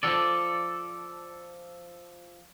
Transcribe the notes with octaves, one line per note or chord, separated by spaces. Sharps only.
F3 A4 D5